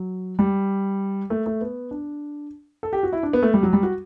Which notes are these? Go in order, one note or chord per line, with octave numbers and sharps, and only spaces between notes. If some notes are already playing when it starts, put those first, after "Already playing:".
Already playing: F#3
G3
A3
A3
B3
D4
A4
G4
F#4
E4
D4
B3
A3
G3
F#3
G3
F#4